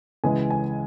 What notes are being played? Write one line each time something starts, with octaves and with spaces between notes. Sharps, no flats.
C#2 C#3 E3 G#3 G#5
G#5